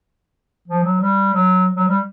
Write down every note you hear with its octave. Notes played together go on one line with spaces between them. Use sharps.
F3
F#3
G3
F#3
F#3
G3